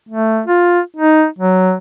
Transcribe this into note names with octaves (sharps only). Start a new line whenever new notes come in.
A3
F4
D#4
F#3